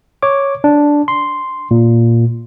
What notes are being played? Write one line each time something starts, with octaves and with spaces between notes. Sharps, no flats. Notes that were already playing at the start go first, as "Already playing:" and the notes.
C#5 D6
D4
C6
A#2